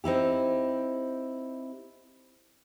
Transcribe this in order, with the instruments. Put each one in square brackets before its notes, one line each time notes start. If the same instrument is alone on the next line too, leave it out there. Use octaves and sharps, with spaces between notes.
[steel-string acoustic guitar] C4 D#4 E4 G4